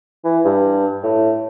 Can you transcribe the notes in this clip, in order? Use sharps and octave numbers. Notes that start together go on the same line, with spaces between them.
E3
G2
A2